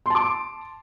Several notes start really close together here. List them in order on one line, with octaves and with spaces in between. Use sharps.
C6 A5 D6